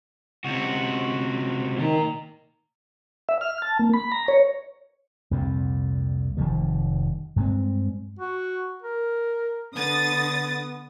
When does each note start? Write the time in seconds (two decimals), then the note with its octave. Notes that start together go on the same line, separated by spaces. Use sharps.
0.45 C#2 C3 F#4
1.78 A#2 D#3 A#5
3.29 E5
3.41 F6
3.62 A5
3.79 A#3
3.93 B5
4.12 A#5
4.28 C#5
5.31 C2 F2 A#2
6.37 F1 D#3 F3 G3
7.36 G2 G#3 C4
8.19 F#4
8.82 A#4
9.75 D3 B3 D#6 A6